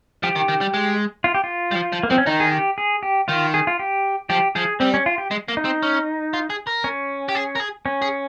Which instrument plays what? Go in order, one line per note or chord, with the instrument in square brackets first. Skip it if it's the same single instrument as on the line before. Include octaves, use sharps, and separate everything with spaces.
[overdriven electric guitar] F3 [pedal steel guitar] G4
[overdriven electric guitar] D#3
D#3
G3
G#3
[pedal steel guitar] F4
G4
F4
[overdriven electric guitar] G3
F3
F3
[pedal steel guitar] A#3
[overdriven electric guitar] F3 [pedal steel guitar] C4
[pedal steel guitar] C#4
[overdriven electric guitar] D#3 [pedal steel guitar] D#4
[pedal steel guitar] G#4
G4
G#4
G4
[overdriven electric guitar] D#3 [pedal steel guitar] F4
[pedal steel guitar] G#4
F4
G4
[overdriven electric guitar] F3 [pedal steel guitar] G4
[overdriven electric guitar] F3 [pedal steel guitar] G#4
[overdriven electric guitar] G3 [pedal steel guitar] C4
[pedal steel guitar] C#4
F4
G4
[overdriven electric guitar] G#3
A#3
[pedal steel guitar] D#4
[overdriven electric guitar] C4
C#4
F4
G#4
A#4
[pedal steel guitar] C#4
[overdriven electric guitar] G4
G#4
A#4
G#4
[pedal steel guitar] C#4
[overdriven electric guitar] G#4